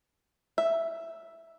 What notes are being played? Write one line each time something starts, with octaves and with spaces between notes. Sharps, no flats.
E5